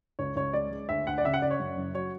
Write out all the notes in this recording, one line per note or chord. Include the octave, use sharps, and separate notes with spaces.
C#2 C#5
C#2 C#5
G#3 D5
G#3
D2 E5
D2 F#5
D5
C#3 E5
F#5
C#3 D5
C#5
F#2
F#1
F#3 C#5